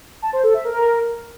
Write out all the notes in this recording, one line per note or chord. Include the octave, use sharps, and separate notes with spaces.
A5
C5
A4
E5
A#4